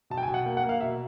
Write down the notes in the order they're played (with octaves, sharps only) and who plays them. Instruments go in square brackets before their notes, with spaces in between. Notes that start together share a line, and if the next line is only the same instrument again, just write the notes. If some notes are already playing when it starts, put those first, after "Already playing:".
[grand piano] B2 A5
G5
G#5
B2
F#5
A#3 G5
F#5
A#3
F5
B2 E5